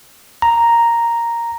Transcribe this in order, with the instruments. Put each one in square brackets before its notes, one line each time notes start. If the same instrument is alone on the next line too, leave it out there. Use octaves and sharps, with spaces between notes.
[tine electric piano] A#5